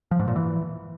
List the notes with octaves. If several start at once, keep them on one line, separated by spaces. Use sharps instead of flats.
F3
G#2
A#2
E3